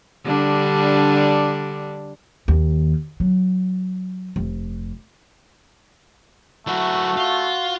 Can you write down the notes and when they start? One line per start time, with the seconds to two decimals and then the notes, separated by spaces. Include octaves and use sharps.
0.25 D3 G3 D4
2.48 D#2
3.20 F#3
4.36 F1
6.67 F#3 A3 E4 F#4
7.17 F4